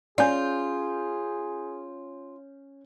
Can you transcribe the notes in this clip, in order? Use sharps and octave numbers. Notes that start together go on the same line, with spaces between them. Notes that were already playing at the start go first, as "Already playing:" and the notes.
C#4 F4 G#4 D5 G#5 G6